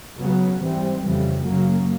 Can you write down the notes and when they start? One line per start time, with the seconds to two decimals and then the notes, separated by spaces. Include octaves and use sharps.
0.18 C#3 F#3 B3
0.60 G#2 E3 G3 C4
1.02 F2 C#3 E3 G3
1.44 F#2 C#3 F#3 A#3